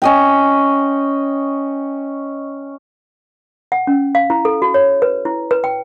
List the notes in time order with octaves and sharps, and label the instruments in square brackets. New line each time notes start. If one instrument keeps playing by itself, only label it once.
[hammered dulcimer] C#4 D#5 G5
[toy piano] F#5
C#4
F5
E4
A4
F#4
C#5
B4
E4
B4
G5